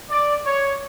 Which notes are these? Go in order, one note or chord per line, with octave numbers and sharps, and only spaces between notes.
D5
C#5